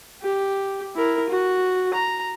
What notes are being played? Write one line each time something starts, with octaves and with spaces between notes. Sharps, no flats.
G4
E4 A#4
F#4
A#5